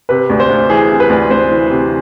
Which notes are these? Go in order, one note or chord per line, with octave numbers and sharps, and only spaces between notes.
C3 B4
D2
C5
D2
E3 G#4
C3
B4
D2
D2 C5
E3
C3